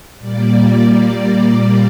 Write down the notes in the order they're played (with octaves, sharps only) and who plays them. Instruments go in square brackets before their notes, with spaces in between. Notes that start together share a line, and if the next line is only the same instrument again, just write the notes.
[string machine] A#2 G3 A#3 D5